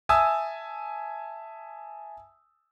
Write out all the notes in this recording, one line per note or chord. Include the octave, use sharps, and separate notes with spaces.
E5 G#5 A5 D#6 E6